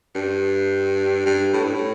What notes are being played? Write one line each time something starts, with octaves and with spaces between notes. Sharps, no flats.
G2
G2
A2
G2
A2